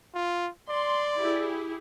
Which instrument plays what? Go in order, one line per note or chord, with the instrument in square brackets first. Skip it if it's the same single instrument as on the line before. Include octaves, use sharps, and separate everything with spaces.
[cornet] F4
[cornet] D5 [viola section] C6
[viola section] E4 G4 G#4